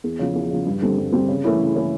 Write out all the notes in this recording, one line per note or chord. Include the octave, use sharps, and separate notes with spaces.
E2
C#3 F3
E2
C#3 F3
G2
D3 G3 C4
G2
D3 G3 C4
C#3
E3 A3 C#4 E4
C#3
E3 A3 C#4 E4